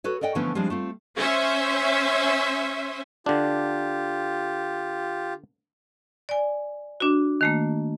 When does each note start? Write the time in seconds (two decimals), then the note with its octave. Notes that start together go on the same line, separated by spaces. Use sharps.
0.04 F#4 A4 B4 C#5
0.21 A#4 D5 D#5 F#5 G5
0.35 D3 E3 F3 A3 B3 C#4
0.55 F3 G3 G#3 C4 D4
0.70 A3 C4 F4
1.17 C#4 C5 E5
3.26 D3 D4 F4 G4
6.29 D5 G#5
7.00 D4 F#4
7.41 D#3 A3 A#3